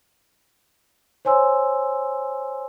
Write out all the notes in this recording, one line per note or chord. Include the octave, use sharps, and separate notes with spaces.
C5 C#5 G#5 C6 E6